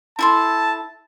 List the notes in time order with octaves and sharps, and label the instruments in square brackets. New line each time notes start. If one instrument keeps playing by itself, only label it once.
[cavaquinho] E4 A4 C6 [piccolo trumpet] A5